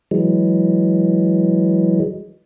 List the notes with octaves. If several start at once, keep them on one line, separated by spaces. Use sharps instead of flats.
E3 F#3 G#3